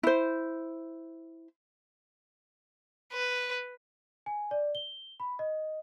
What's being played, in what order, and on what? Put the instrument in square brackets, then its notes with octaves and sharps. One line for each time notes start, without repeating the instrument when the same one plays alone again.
[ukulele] E4 C5
[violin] B4
[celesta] G#5
D5
G7
B5
D#5